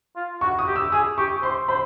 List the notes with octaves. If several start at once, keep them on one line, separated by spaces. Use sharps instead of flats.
F4
F#4 C#6
D#6
G4
E6
G#4 D#6
G4 C#6
C5 C6
C5 B5